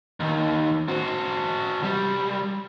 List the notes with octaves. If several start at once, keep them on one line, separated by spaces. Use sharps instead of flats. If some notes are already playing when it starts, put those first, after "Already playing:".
D#2 D#3
C4 F#4
C2 G3